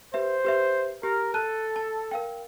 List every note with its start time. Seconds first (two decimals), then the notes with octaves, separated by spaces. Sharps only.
0.14 G4 B4 C5 E5
0.44 G4 B4 E5
1.03 G4 A#4
1.34 A4 A5 F#6 D#7
1.76 A5
2.11 A#4 F5 G5